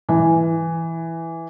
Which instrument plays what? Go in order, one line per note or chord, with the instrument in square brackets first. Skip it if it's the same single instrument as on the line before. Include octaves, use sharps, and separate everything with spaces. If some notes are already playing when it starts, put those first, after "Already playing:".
[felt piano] E3